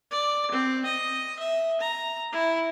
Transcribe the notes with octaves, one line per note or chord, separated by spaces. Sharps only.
D5
C4
D#5
E5
A#5
E4